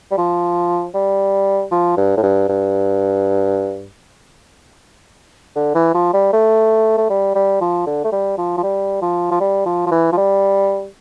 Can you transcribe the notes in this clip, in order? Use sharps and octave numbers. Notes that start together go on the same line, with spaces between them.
G3
F3
G3
F3
G2
A2
G2
G2
D3
E3
F3
G3
A3
A3
G3
G3
F3
D3
A3
G3
F3
F3
G3
F3
F3
G3
F3
F3
E3
F3
G3